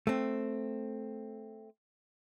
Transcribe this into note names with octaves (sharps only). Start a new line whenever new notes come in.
A3 C4